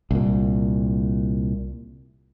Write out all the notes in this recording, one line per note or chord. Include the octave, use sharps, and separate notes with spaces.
C2 A#2